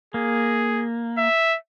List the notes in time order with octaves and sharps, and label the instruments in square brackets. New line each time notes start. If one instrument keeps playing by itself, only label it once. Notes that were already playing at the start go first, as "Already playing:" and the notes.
[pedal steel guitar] A#3 [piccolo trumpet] G#4
[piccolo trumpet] E5